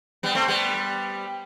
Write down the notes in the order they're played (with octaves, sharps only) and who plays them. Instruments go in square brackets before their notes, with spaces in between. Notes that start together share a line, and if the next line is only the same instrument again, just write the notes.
[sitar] G3 B3
A3 C4
G3 B3